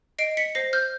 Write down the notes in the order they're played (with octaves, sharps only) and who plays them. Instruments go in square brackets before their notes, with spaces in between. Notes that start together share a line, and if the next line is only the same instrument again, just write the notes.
[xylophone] D#5 C7 D7
B6 C#7
C5 A#6 C7
F6 G6